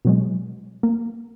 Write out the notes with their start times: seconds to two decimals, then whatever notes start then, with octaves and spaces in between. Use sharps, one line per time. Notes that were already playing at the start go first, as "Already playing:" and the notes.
0.05 B2 F#3 G#3
0.83 A#3